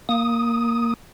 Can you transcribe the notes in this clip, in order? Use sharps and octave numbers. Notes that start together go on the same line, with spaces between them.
A#3 D#6